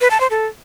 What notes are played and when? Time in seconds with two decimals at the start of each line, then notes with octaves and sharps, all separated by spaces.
0.01 B4
0.11 A5
0.21 C5
0.31 A4